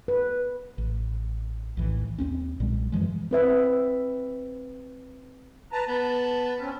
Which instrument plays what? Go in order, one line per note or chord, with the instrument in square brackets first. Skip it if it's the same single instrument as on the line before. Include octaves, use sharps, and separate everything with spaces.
[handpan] B4
[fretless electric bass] A1
A#1 D#2 A2 E3
D#2 C4 C#4
B1 A#2 G3 G#3
F#2 E3 F3 G#3
[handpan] C4 B4 E5
[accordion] B4 A5 A#5
[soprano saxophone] B3 [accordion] A5
[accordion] C4 C#4